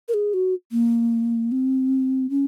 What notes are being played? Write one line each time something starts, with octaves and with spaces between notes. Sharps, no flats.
A#4
G#4
F#4
A#3
C4
C#4